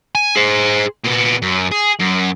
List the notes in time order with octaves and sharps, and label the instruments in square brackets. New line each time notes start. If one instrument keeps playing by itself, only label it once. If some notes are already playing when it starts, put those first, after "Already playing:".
[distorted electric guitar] G#5
G#4 C5
A#2 B3
F#2
G#4
F#2